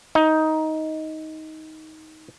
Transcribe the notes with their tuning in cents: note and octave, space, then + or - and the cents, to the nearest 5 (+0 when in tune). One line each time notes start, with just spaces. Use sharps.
D#4 +15